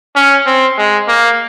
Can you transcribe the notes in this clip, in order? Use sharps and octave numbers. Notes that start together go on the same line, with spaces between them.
C#4
C4
G#3
A#3